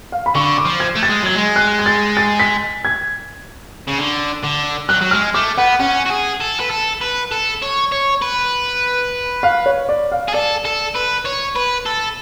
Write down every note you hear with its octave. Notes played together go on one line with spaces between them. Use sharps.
F5
B5
D3 C#6
D6
F3
G#6
A3
A6
G#3
F#3 G#6
G#3
F#6
G#6
A6
A6
B6
G#6
C#3
D3
D3
F#3 F#6
F#3
G#3 F6
A3 D6
B3 F#5
C#4 F#5
F#4
G#4
A4
B4
A4
B4
A4
C#5
C#5
B4
F5
C#5
D5
F5
G#4
A4 D5
A4
B4
C#5
B4
A4